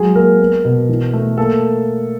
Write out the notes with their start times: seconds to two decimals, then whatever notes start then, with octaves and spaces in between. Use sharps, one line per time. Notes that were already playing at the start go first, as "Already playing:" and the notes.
Already playing: F#3 G#3 G#4
0.15 A#3 A#4
0.40 B3
0.65 B2
0.89 E3
1.13 A3
1.37 A#3 A4